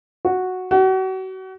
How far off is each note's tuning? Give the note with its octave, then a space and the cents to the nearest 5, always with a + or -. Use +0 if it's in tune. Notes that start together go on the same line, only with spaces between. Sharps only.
F#4 -5
F#4 +35